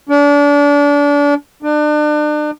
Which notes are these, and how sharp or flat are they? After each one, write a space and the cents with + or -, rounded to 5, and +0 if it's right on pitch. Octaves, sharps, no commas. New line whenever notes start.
D4 -30
D4 +35